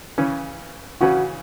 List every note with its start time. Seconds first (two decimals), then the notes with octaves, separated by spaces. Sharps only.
0.18 C#3 E3 C#4
1.01 C#3 E3 C#4 F#4